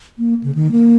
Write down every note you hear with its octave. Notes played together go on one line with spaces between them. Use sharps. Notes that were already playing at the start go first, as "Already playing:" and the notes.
A#3
C#3
D#3
A#3